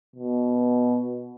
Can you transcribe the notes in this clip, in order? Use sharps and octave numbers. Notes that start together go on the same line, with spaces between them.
B2